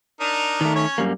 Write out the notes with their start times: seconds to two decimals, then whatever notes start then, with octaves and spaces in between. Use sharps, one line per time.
0.20 D4 D#4 A#4
0.61 D#3 A3
0.75 C#4 C#5
0.98 F#2 G3 A#3